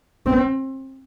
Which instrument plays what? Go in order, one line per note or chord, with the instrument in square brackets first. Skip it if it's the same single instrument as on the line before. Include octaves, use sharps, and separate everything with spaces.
[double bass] C4